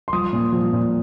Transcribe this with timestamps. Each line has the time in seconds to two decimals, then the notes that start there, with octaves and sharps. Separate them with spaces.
0.08 C6
0.13 F3 D#6
0.33 A#2
0.53 F3
0.73 A#2